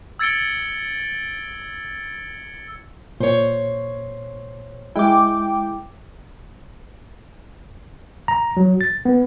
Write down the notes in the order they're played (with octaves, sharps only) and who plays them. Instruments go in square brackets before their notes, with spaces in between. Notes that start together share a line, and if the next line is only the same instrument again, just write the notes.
[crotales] E6 G#6 A6 C#7 D7 G7
[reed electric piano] A#2 [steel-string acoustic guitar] C5 C#5
[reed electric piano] G#3 E4 [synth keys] G5 D6
[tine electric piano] A#5
F#3
A6
B3